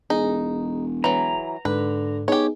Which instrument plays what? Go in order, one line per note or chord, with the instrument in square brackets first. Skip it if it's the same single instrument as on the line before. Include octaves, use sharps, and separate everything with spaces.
[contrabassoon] E1 [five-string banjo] D#4 [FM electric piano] G#4
[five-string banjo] E3 F#3 [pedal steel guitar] A#5
[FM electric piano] G#2 [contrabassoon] D3 [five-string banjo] B4
[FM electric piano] B3 D#4 G#4 [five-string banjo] G4 C#5